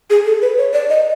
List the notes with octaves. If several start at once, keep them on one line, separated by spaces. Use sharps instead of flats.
G#4
A4
B4
C#5
D5
D#5